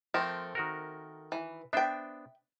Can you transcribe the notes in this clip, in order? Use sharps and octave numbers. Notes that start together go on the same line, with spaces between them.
F3 A3 C4 A#4 E5
D#3 F#4 A#4
E3
B3 D4 C5 E5 G5